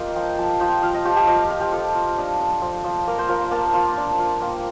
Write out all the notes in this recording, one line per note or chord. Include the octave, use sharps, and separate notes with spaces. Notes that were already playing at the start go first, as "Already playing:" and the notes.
Already playing: A#3 F4 G4 D#5 F5
F3 G5
F3 A5
F3 G5
F3 F5
D#5
F3 G4
G4
F3 D#5
F5
F4 F5
G4
F4 A4
F4
D4
D4
F3
F3
A#3 A#4
C5
F3 A#4
A#3 A5
F4
D4
F4
A#3 G5